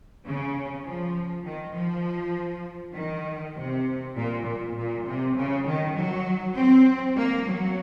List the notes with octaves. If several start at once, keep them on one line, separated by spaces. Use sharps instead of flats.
C#3
F3
D#3
F3
D#3
C3
A#2
A#2
A#2
C3
C#3
D#3
F#3
C4
A#3
F#3